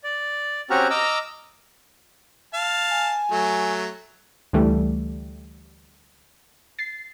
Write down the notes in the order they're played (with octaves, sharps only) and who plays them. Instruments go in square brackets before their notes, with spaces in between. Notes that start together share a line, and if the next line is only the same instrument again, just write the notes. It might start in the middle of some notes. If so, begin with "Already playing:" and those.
[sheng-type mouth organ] D5
C4 C#4 F#4 G4 A#5 F6
D#5 A#5 D6 E6 F6
[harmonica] F5 A5
[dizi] G#5
[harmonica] F#3 A3
[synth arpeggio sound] D2 E3 G3 A3
A6 C7